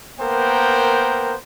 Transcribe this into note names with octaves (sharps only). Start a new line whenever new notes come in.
A#3 B3 A#4 C5 G5